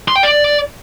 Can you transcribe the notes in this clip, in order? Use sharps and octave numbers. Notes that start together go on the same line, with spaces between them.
C6
G5
D5